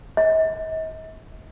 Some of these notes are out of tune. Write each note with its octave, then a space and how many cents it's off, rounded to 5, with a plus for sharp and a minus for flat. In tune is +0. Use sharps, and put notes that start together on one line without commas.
D#5 +40